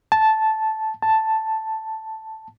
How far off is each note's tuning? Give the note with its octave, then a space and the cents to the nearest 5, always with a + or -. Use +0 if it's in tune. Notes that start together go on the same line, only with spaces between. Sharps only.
A5 -10
A5 +0